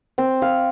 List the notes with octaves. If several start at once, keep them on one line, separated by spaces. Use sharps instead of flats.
C4
F5